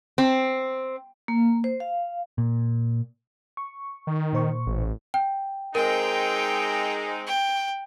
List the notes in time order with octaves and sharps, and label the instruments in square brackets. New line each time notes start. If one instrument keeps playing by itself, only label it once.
[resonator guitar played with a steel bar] C4
[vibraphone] A#3
C5
F5
[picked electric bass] A#2
[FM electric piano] C#6
[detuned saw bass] D#3
[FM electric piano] A#2 C5 C#6
[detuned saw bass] A1
[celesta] G5
[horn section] G#3 C4 D#4 [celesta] A#4 [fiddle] G5
[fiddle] G5